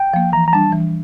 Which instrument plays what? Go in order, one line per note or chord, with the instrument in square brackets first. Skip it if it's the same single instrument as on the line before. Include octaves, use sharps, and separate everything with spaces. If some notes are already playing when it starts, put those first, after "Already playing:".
Already playing: [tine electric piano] G5
[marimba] F3 A#3
[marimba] E3 [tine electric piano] A#5
[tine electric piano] A#5
[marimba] G3 D4 [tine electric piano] A5
[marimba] E3